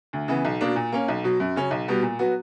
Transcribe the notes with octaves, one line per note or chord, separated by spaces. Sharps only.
D2
C#3 E3 B3
B1
B2 A#3 D4
A#2
A#3 C#4
B1
B2 F#3
F#2
C#3 F#3 C#4
B1
B2 G3 B3
A#2
F#3 B3 F#4